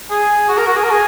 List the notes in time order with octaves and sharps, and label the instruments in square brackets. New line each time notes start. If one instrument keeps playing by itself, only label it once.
[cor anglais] G#4
F#4
A#4
F#4
G#4
A#4
G#4